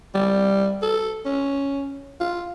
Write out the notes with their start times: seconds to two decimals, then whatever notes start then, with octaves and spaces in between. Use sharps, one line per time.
0.15 G3
0.82 A4
1.26 C#4
2.20 F4